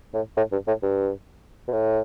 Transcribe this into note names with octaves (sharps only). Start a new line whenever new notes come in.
A2
A2
G2
A2
G2
B2
A2